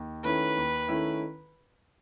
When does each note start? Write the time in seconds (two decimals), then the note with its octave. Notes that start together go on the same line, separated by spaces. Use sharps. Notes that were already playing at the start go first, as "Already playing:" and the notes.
Already playing: D#2
0.24 D#3 A3 C#4 E4 B4
0.57 D#2
0.89 D#3 A3 C#4 E4